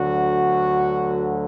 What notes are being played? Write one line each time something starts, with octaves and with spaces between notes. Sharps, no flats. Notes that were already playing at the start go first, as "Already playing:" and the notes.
Already playing: D2 D3 F#3 F#4